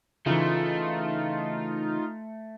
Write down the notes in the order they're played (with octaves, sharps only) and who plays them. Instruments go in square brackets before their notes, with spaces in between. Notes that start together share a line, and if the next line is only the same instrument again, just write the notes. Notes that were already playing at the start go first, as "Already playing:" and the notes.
[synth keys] C#3 E3 [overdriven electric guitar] A3 [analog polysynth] D#4 F4